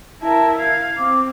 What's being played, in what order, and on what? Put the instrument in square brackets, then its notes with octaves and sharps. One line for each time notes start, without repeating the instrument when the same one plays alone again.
[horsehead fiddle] E4 A#4 [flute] A5
[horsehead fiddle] F5 [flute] G#6
[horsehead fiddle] C4 [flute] D6